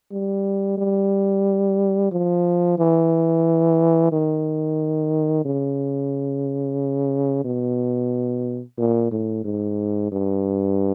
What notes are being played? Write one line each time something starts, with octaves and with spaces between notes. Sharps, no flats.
G3
G3
F3
E3
D#3
C#3
B2
A#2
A2
G#2
G2